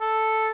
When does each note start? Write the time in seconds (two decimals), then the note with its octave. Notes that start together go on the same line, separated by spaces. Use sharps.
0.01 A4